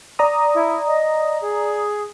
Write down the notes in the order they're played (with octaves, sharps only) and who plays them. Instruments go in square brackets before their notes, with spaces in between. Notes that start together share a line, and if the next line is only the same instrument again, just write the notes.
[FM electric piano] D5 A#5 D#6
[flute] E4
D#5
G#4